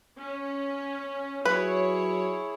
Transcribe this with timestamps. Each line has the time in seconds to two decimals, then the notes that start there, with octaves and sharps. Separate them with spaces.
0.18 C#4
1.45 F#3 E4 G#4 B4 C#5